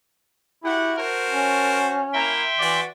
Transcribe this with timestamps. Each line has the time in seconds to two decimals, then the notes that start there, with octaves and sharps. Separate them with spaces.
0.64 E4 F#4 G4 F#5
0.97 F#4 A#4 C5 A5
1.30 C#4
2.13 A#3 E4 E5 G5 A#5 C6
2.59 E3 F#4 D5